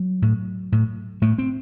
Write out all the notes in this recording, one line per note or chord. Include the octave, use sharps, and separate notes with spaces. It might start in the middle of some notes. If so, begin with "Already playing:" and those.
Already playing: F#3
A2
A2
A2 A3
C4